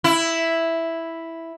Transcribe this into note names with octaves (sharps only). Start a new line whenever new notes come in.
E4